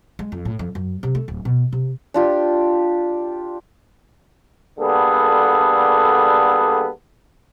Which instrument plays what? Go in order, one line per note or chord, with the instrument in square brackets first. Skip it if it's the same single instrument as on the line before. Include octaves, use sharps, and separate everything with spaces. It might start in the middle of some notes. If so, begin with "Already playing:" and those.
[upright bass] G#3
F2
A2
F2
F#2
C3
A3
D1
B2
C3
[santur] D4 F4 G4
[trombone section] D3 G3 A#3 B3 G#4 A4